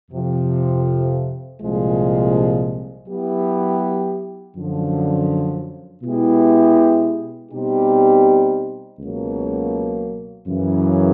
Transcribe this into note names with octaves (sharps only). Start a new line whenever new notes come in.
F2 C3 F3
C2 A#2 F3 G#3
F#3 B3 E4 G4
F#2 D3 F3
B2 G#3 B3 E4 G4
B2 G3 C4 D#4 G4
C#2 B2 F#3 A#3
F#2 C#3 E3